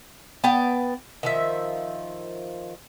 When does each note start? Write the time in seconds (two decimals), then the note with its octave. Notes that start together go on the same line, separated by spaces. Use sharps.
0.44 B3 G5 A5
1.23 D#3 F3 E5